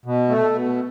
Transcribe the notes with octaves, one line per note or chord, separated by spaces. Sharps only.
B2
A3
B2